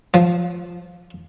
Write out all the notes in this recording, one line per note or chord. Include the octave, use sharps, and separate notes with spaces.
F3